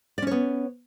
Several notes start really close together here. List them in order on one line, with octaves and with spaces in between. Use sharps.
D5 C#4 C#5 B3